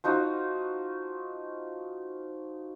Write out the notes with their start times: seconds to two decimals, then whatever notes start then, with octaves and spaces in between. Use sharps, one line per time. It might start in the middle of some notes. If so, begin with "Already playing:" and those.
0.04 F3 D#4 F#4